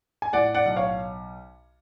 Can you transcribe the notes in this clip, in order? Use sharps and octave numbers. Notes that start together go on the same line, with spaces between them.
G#5
A2 D5 F#5
D5 F#5
B1
C#5 F5